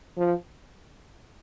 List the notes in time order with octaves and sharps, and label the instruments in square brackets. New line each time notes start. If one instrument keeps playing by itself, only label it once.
[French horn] F3